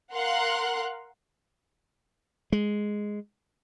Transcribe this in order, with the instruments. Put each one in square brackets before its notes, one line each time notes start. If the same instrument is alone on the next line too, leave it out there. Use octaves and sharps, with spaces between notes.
[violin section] A#4 F5 F#5 C6 F#6
[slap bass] G#3